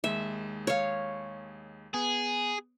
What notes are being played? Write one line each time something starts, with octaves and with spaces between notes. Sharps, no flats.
D#2 G#3 E5
C#5 F5
B3 G#4